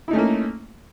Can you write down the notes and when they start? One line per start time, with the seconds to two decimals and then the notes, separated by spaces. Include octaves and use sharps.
0.08 E4
0.11 D#4
0.13 A3
0.16 C#4
0.19 A#3